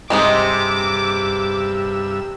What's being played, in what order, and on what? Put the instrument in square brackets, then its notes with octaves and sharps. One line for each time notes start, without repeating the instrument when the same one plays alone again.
[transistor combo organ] G2 E6 [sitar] C3 [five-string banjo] G#3 C4 D#4 [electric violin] D6